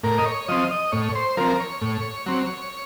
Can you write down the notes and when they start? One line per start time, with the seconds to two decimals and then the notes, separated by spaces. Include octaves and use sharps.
0.03 A2 A#4
0.18 D#5
0.26 C#5
0.48 F3 C4 D#5
0.71 D#5
0.92 A2 C#5
1.15 C5
1.37 F3 C4 A#4
1.60 C#5
1.82 A2
2.26 F#3 C4